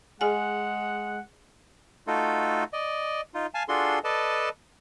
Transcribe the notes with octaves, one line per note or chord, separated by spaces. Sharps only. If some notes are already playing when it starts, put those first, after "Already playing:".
G#3 G#4 F#5 G#5
A3 D#4 F4 F#4 A4
D5 D#5
D#4 F4
F5 G#5 A5
D4 F4 F#4 G#4 A4 C6
A4 B4 D5 D#5 A5